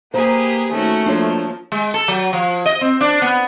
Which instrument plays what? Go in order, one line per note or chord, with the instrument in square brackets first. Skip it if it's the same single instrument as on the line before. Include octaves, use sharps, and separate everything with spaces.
[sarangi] A#3 [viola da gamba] G4 G#4 B4 [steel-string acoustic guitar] C5 A#5
[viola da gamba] D#3 C#4 F#4 [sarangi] A3
[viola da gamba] F3 A#3 [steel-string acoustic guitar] D4 F4 C#5
[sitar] G#3
A4
F#3
F3
D#5
C4
D4
B3